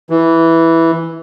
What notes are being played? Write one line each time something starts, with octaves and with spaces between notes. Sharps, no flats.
E3